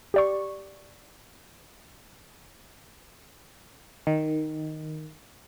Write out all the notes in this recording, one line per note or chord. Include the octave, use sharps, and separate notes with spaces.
G4 D5 C#6
D#3